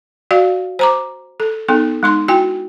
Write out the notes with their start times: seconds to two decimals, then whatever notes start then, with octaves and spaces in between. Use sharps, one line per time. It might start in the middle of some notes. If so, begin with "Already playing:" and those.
0.31 F#4 D5 F5
0.79 C5 A#5 D6
1.40 A4
1.68 B3 D#4 A4
2.03 G#3 D#4 C6
2.28 E4 F#4 G5 G#5